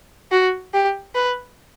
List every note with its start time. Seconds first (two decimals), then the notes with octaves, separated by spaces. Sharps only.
0.31 F#4
0.74 G4
1.15 B4